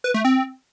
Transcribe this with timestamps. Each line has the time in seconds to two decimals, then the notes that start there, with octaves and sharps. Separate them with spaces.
0.04 B4
0.14 A3
0.25 C4